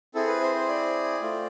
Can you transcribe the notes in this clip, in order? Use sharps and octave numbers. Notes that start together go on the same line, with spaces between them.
C4 E4 G#4 A4
B4
C5
C5
D5
A3 C4 F4